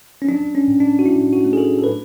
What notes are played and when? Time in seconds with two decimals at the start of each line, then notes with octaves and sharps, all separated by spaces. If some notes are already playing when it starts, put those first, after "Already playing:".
0.22 C#4
0.29 F#3 D4
0.55 C#4
0.68 A2
0.80 D4
0.99 F#4
1.06 A2 E4
1.33 F#4
1.45 A3
1.53 G#4
1.58 A4
1.79 A4
1.84 B4